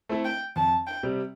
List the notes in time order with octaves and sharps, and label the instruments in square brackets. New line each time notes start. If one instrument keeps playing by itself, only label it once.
[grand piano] A3 C4 E4 A4
[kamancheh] G5
[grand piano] F2 [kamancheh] A5
[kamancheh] G5
[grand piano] C3 G3